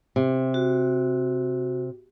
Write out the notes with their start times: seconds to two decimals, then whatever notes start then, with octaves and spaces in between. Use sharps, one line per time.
0.16 C3
0.54 F#4